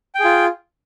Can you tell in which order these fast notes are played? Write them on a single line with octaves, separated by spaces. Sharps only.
G5 G#4 F4